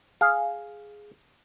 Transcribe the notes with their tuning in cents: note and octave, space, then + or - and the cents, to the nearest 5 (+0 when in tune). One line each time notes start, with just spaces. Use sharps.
G#4 +0 F5 +0